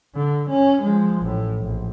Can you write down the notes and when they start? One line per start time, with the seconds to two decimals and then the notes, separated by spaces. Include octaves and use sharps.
0.16 D3
0.49 C#4
0.82 F3 G#3
1.21 A1 A2
1.59 A#1